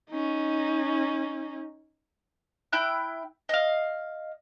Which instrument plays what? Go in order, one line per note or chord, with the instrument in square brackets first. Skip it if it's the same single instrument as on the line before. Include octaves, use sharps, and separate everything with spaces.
[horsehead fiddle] C#4 D#4
[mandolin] E4 G5 F6 F#6
D#5 F5